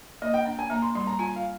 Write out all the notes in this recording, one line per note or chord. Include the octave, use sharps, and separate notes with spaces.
A#3 D#5
G5
D4 G5
G#5
A#3 A#5
C6
G3 C6
A#5
F4 G#5
F5